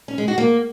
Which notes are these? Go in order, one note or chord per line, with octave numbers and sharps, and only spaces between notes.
C#4
G#3
F#4
A#3